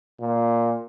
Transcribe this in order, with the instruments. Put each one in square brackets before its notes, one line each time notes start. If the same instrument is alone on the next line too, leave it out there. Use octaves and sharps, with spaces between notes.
[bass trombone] A#2